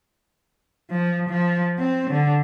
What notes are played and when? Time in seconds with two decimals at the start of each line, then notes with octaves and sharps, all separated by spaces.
0.91 F3
1.29 F3
1.79 C4
2.10 D3